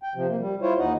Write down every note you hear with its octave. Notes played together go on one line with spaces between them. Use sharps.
G5
C3 F3
A#3
G3
E4 F4 C5 C#5
D#2 D#4 D#5 F#5